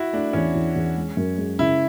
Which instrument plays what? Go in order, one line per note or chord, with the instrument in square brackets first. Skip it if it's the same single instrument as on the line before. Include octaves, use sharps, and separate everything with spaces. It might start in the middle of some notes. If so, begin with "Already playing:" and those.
Already playing: [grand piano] E4 F#4
[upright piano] A3 [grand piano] D4
[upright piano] E2 [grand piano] C#4
[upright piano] E2
E2
G#3
F#2
G#3
[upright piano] C#3 [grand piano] E4